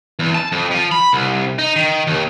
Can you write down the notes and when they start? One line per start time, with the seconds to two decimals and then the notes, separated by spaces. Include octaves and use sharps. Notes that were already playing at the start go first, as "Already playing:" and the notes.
0.19 E2
0.35 A5
0.52 F2
0.71 F3
0.92 B5
1.13 C2
1.59 D#4
1.76 D#3
2.07 D#2